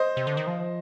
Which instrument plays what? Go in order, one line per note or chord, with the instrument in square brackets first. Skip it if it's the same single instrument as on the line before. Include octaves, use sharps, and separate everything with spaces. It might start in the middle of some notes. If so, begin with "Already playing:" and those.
Already playing: [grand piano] C5 D#5
[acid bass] C3
D3
D#3
F3